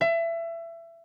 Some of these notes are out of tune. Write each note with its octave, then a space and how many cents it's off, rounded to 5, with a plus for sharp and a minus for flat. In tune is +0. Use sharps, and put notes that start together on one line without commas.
E5 +25